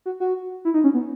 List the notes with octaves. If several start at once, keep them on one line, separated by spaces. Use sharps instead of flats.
F#4
F#4
E4
D#4
C#4
B3